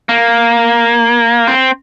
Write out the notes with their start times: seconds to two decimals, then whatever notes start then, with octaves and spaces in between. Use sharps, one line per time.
0.09 A#3
1.47 C4